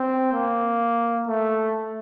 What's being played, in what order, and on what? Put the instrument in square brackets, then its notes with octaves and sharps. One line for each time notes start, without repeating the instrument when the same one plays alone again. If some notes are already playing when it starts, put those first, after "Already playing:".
Already playing: [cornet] C4
A#3
A3